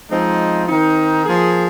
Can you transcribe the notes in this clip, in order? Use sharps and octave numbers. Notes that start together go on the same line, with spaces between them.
F3 G#3 C4 D#4
D#3 C4 D#4
F3 A#3 G#4